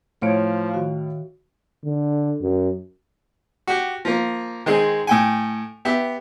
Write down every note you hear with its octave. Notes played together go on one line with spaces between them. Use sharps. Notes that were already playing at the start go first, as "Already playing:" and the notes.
A2 F3 C#5 F5 G#6 D7
D#3 F#4
D3
F#2
F#4 G4
F3 A#3
D#3 G#3 C4 G#4
A2 G5 G#5
B3 G4 E5